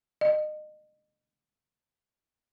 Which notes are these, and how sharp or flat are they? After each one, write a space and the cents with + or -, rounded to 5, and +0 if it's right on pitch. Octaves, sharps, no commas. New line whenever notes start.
D#5 -30